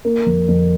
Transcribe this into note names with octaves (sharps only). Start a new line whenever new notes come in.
A#3
F2
F2